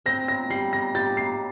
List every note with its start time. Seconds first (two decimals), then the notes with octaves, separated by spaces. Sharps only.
0.06 C4 A#6
0.28 A#6
0.50 G3 C7
0.73 A#6
0.95 G4 A6
1.17 C7